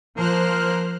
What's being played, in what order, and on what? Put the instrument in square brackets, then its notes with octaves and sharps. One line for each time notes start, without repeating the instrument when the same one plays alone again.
[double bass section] F3 [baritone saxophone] A#3 [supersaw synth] C5 F6 F#6